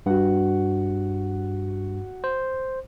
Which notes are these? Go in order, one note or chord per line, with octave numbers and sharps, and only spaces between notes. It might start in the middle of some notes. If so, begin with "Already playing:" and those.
G2 F#4 F#5
C5